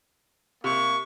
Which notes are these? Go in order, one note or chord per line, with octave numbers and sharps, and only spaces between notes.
C3 A#3 C#6